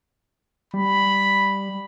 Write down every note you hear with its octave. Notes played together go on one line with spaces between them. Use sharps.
G3 B5